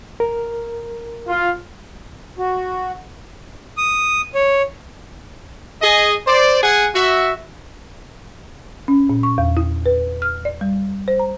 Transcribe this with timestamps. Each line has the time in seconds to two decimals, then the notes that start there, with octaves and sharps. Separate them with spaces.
0.20 A#4
1.28 F4
2.38 F#4
3.77 D#6
4.35 C#5
5.82 G#4 D#5
6.27 C5 D5
6.63 G#4 F#5 G#5
6.95 F#4 E5
8.88 C#4
9.10 A#2
9.23 C#6
9.38 E2
9.57 E4
9.86 B4
10.22 F6
10.45 D5
10.61 G3
11.08 C5
11.19 A#5